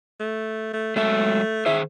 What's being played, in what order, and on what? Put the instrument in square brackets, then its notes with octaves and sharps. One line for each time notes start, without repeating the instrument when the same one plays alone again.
[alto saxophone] A3
A3
[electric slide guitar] F#3 G#3 E5 [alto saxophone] A3
[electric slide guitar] D#3 G#4 C5 [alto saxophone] E5